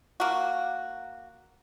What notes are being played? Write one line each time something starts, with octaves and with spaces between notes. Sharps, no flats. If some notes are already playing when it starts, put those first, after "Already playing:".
A#3 F#4